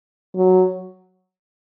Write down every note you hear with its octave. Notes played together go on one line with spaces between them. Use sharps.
F#3